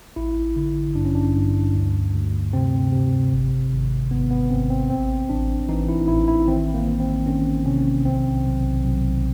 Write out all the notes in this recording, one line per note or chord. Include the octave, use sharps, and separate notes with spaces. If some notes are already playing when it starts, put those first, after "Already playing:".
A1 E4
D3
G2 D4
C#4
D4
G2
D2
D2
C3 C4
C3
G#1
G#1
G#1 B3
B3
G#1 C4
C4
A1 C4
A1 D4
E3 D#4
E4
A1 E4
E4
D#3 C4
A#3
D#3
C4
D#3 C#4
C3 C#4
B1 C4
B1
B1